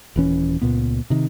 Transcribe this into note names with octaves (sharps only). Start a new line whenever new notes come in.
D#1 E3 C#4
C#2 A#2 B3
C3 D#3